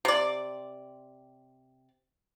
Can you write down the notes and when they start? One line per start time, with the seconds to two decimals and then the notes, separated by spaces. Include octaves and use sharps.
0.05 C3 D5